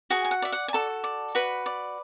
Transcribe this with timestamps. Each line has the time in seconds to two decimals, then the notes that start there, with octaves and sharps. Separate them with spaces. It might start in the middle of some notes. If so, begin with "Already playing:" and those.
0.10 F#4 G#4 G#5
0.24 G#5
0.31 F#5
0.42 D5 E5
0.52 F#5
0.68 G#5
0.73 F#4 A4 A5
1.04 D5
1.35 F#4 B4 B5
1.66 D5